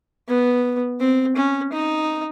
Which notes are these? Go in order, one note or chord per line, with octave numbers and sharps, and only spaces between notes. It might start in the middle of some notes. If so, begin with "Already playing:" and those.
B3
C4
C#4
D#4